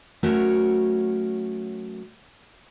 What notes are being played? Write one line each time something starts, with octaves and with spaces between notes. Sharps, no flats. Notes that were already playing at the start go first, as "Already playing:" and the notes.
F#3 A3 C#4 F#4 A#4 C#5